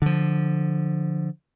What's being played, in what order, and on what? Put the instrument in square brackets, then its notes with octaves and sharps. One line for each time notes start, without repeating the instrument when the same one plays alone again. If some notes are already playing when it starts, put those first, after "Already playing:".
[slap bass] D3 F3